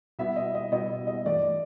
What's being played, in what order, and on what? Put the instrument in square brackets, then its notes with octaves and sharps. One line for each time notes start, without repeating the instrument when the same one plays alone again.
[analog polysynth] B2 G3 B3 E4 [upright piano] E5
[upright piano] D#5
D#5
[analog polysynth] B2 G3 B3 E4 [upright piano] D#5
[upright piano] D#5
[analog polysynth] G2 E3 A3 [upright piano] D5